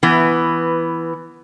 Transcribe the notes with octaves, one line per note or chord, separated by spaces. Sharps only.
E3 B3